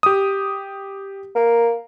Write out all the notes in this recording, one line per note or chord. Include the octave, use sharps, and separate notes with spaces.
G4 D#6
A#3